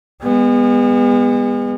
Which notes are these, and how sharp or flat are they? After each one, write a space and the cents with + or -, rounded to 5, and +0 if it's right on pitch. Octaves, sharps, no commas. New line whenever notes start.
G#3 -40 B3 +0